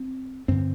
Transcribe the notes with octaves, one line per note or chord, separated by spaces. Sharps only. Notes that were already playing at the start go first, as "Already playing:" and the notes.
Already playing: C4
G2 D3 C4